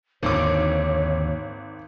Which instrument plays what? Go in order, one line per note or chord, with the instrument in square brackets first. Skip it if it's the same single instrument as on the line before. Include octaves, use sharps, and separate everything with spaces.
[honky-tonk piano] G#1 D6 [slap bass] D#2 D3 [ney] C#5